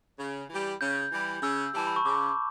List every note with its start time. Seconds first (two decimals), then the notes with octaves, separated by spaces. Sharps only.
0.19 C#3
0.49 E3 G3
0.81 C#3 G6
1.11 E3 G3
1.42 C#3 E6
1.74 E3 G3 A5
1.87 B5
1.96 C#6
2.05 C#3 D6